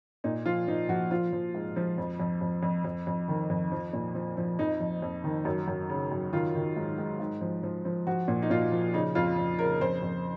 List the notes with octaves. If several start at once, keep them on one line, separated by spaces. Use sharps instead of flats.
A#2 D#4
F3 F4
F3 D#4
F3 F#4
F3 F4
F3
G#2
F3
F2
F2
F2
F2
F2
F2
D#3
F2
F3
A#2
F3
F3
F2 D#4
F2
F2
D#3
F#2
F#2
C#3
F#2
D#3 F4
D#3
G#2
G#2
G#2
F3
F3
F3
F3 F#4
A#2
D#4
A#2 F4
F3
C#3 D#4
F2 F4
F2
C#3 A#4
F2 C5
F2